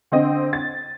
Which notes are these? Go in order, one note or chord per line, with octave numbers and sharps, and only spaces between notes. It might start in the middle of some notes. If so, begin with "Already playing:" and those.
D3 C4 D#5
A6